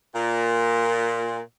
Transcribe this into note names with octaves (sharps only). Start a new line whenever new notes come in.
A#2